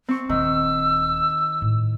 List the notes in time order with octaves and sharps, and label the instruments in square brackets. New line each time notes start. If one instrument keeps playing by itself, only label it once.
[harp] C4 C#6
[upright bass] D#1 D4 [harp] D#3 [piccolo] E6
[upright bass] A2